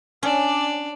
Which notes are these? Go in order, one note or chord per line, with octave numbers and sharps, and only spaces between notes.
C#4 D4 D5